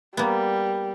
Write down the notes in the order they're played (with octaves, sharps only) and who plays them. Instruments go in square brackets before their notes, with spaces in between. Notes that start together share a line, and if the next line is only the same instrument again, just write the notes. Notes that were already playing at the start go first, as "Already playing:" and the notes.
[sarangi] G3 [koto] A#3 B3